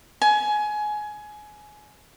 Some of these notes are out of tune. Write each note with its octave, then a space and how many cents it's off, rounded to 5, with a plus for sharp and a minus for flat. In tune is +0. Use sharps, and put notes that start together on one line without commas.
G#5 +20